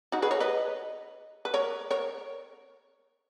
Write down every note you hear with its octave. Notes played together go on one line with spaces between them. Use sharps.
D#4 F#4
G#4 B4
A#4 C#5
B4 D#5
B4
A#4 C#5
A#4 C#5